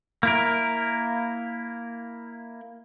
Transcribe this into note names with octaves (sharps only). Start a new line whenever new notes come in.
A#3 E4 A#4